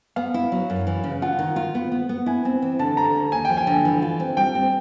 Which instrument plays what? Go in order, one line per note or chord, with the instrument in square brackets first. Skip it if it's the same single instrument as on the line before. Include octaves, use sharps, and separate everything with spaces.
[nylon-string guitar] B3 [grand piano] F5
[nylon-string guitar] E4
F#3
F#2
E3
C#3
[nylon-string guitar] F4 [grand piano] F#5
[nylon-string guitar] D#3
F4
B3
B3
B3
[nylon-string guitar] E4 [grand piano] G#5
[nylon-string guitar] C4
E3
[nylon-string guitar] D3 [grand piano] A5
[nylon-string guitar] D3 [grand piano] A#5
[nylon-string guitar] D2
[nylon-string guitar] D#2 [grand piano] G#5
[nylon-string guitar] F3 [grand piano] G5
[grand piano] G#5
[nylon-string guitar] D3
E3
F4
C4
[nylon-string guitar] G3 [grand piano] G5
[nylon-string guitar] C4